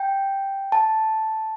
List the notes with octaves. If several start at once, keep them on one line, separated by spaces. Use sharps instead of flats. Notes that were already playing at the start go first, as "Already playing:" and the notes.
Already playing: G5
A5